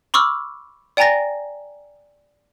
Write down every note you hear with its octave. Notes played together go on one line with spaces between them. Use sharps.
B5 C#6 D6 E6 F6
D5 G5 G#5 A#5 A6 A#6